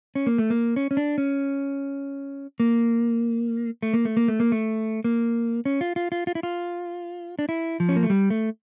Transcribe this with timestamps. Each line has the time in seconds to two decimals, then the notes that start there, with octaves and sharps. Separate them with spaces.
0.15 C#4
0.27 A#3
0.38 A3
0.50 A#3
0.76 C#4
0.91 C#4
0.97 D4
1.18 C#4
2.60 A#3
3.83 A3
3.93 A#3
4.05 A3
4.17 A#3
4.28 A3
4.40 A#3
4.52 A3
5.04 A#3
5.65 C#4
5.81 F4
5.96 F4
6.12 F4
6.27 F4
6.35 E4
6.43 F4
7.39 D4
7.49 E4
7.80 F3
7.89 C#4
7.96 A#3
8.03 A3
8.10 G3
8.30 A3